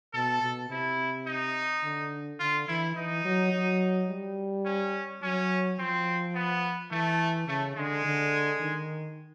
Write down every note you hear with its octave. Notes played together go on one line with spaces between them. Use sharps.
B2 A4
B2
C3 E4
D#4
D3
D3 F4
E3 E4
E3 D#4
F#3
F#3
G3
C#4
F#3 C#4
F3 C4
B3
E3 A3
C#3 A3
D3 G#3
D3
D#3